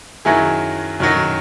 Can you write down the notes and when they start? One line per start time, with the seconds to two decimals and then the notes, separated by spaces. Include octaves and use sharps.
0.25 F#2 D#3 F#3 E4 G#4
1.00 F#2 D#3 F#3